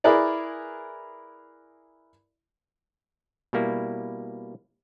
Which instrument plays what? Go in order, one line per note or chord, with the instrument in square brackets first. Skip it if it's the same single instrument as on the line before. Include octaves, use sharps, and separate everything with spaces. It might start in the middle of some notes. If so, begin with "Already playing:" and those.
[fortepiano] E4 G#4 A#4 B4 D5
[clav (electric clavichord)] B2 G3 A#3 E4